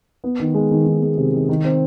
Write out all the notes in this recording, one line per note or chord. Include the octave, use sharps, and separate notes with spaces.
B3
D#3
G#3
D#3
D#3
G#3
C3
D#3
D#3
C4